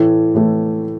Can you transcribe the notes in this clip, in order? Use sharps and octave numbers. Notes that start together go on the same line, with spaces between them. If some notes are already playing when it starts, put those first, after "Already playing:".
Already playing: A2 E3 A3
A2 E3 A3